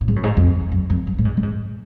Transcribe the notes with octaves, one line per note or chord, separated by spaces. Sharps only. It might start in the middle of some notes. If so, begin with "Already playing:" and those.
A2
G#2
F#2
G#2
F2
F#2
F2
F#2
A2
G#2
A2
G#2